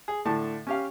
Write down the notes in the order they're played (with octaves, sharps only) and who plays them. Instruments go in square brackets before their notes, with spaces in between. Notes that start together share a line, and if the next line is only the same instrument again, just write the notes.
[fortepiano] G#4
A2 D3 A5
C#4 G4 F5